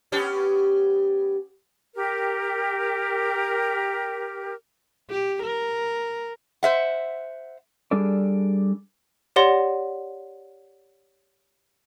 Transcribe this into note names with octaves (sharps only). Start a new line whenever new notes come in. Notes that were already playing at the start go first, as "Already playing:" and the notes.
B3 C#4 G4
G4 A#4
G4
A#4
C5 E5 F#5
G3 D4 G#4 A4 D5
G4 C#5 D5 F#5 C6 A#6